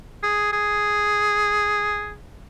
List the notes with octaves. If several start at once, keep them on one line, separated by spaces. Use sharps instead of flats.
G#4
G#4